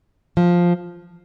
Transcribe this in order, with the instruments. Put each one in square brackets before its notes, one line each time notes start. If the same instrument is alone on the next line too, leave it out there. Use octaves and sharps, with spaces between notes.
[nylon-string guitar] F3